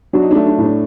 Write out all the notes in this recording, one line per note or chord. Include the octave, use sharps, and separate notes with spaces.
F#3 D4 F#4
D#4
A3 D4
D4
A2
D4